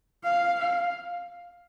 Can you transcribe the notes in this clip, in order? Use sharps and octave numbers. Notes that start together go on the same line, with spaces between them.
F5
F5